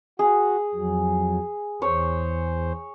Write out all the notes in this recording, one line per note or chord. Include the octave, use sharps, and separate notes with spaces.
F#4 G#4
F2 F#3
E2 C5 C#5